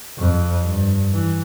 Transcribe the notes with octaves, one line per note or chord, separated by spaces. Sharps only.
F2
G2
E3